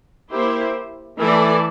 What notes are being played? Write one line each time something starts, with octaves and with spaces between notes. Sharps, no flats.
A#3 E4 G4 C5
E3 A3 E4 A4 D5